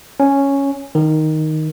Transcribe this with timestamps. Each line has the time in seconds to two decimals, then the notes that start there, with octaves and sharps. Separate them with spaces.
0.20 C#4
0.95 D#3